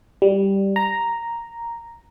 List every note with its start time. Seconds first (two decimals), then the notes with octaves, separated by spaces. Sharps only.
0.22 G3
0.76 A#5